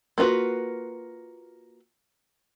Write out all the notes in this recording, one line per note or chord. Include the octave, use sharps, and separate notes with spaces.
A#3 F4 F#4 B4